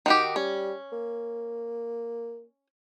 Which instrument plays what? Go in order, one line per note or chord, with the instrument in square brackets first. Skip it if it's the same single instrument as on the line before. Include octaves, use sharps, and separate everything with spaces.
[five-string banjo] D#3 F#4 G4
[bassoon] G3 [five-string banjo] C#4
[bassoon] A#3